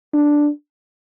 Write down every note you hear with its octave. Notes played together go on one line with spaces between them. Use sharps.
D4